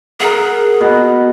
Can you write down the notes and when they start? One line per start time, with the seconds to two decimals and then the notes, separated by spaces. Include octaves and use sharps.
0.20 G#4 A#4 F#5
0.81 B2